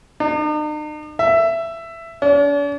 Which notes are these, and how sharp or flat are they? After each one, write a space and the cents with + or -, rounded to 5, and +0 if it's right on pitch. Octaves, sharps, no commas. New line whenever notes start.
D#4 -45
E5 +15
D4 -45